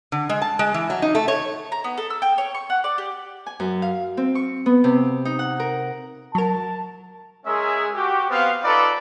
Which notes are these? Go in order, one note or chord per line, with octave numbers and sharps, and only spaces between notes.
D3
G#3
A5
G#3
E3
F#3
D#4
A3
C#5
A#5
B3
A4
E6
G5
C#5
C#6
F#5
D5
G4
G#5
F#2
F5
C4
C#6
B3
C3
D#4
F#5
A#4
F#3 A#4 A5
G#3 C#4 G#4 A#4 E5
F#4 G4
B3 C4 F5
D#4 F4 A4 B4 D5